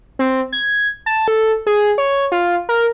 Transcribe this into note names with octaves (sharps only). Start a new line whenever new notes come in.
C4
G#6
A5
A4
G#4
C#5
F4
A#4